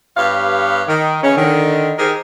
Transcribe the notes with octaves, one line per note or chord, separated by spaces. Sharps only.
G2 B3 G4 C#5 F5
D#3
C#3 E3 C#4
D3 D#3
D#3 C4 G4 G#4 A#4